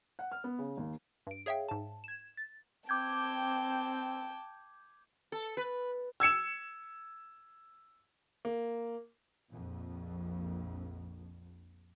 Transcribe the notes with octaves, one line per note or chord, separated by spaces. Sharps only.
F#5
F6
B3
C#3
D#2
G2 D7
G#4 C#5 E5 F5 G5
G#2 A5
G#6 E7
A6
C4 G5 A5 D6 G6 G#6
A4
B4
E6 G#6 C#7 E7
A#3
A#1 F2